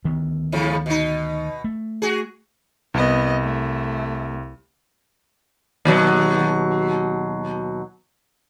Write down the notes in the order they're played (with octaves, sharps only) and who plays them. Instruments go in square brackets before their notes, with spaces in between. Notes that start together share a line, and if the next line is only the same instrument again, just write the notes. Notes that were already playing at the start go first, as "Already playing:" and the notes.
[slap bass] D2 D#3 B3
[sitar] G#2 C#3 F3
B2 D#4
[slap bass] A3
[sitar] F#4 G#4
[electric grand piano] C2 [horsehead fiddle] B3 D#5
[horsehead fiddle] A3
[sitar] D#2 B2 F#3